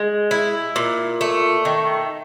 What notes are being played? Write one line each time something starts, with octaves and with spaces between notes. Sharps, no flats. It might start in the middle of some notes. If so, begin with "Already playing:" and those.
Already playing: G#3
E4
A#2
A3
D#3